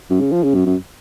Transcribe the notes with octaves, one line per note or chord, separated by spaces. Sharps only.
F#2
C#3
F3
C#3
F#2
F#2